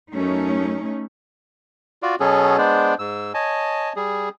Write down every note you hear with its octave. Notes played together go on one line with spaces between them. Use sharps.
F#2 A3 C#4 D#4
F4 F#4 D5
B2 F#3 B3 C#4 G#4 A4
G#3 B3 D4 C5 D5
G#2 E6
C#5 D#5 G#5 A5
G3 G#4